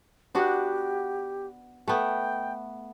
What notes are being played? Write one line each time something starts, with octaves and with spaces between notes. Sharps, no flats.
B3 D4 F#4 G4
A3 B3 G5